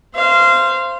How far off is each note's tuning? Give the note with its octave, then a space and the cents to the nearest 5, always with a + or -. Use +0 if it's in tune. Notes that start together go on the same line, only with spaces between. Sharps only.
C5 +0 F5 -25